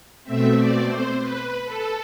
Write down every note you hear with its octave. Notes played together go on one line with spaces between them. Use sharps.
B2 A3 C4 E5
D5
C5
B4
A4